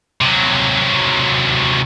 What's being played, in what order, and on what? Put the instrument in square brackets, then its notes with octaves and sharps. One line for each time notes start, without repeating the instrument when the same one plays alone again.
[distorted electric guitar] C3 F#3